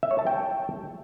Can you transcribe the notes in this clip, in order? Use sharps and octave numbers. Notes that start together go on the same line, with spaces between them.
E5
C#5
A5
G5